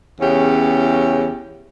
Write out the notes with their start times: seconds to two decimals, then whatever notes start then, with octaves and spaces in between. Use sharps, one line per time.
0.20 E2 C#3 C#4 G4